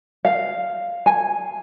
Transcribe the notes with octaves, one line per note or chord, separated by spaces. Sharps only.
F5
G#5